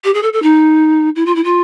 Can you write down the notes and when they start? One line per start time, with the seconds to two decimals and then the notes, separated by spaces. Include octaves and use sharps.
0.04 G4
0.14 G#4
0.23 A4
0.33 A4
0.43 D#4
1.16 E4
1.26 F4
1.35 E4
1.44 F4